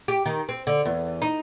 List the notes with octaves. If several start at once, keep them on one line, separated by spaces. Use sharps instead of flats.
G4
D#3
C4
D3
E2
D#4